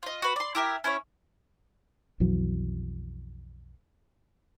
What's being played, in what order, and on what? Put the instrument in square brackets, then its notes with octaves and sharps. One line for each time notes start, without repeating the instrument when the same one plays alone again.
[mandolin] F4 D#5
F#4 B4
D5 C6
E4 G4 A#4 E5
C#4 E4 C5 C#5
[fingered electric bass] B1 F2 E3 F#3